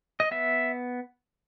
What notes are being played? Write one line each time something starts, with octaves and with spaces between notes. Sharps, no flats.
D#5
B3 E5